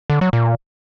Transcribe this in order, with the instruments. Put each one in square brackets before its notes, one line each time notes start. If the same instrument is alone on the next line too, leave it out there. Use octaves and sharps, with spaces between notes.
[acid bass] D3
F#3
A#2